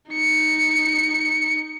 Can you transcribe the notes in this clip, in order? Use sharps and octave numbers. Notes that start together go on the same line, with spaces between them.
D#4 C#7